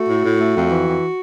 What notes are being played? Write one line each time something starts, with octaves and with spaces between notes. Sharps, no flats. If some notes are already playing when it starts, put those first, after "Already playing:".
Already playing: A3 F#4
A2
A2
A3
F2
E3
F2